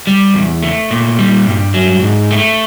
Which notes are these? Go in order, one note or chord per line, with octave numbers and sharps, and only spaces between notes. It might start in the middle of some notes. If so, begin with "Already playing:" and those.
G3
E2
A3
A#2
G3
G2
F#3
G#2
A3